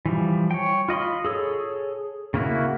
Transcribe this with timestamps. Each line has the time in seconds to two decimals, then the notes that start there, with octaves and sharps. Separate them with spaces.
0.06 E3 F3 G3
0.51 C#5 G5
0.88 F4 D#5 B5 C6
1.25 G#4 A4 C#5
2.34 C#3 A#3 E4 F#4